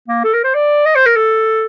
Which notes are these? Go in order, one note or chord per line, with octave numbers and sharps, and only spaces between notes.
A#3
A4
A#4
C5
D5
D#5
C5
A#4
A4